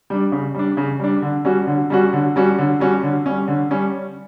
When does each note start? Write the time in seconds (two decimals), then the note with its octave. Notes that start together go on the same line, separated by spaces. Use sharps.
0.10 G3 D4
0.32 C#3
0.54 G3 D4
0.77 C#3
1.00 G3 D4
1.22 D3
1.45 G3 C#4 F#4
1.67 D3
1.90 G3 C#4 F#4
2.13 D3
2.36 G3 C#4 F#4
2.58 D3
2.80 G3 C#4 F#4
3.03 D3
3.26 G3 C#4
3.48 D3
3.71 G3 C#4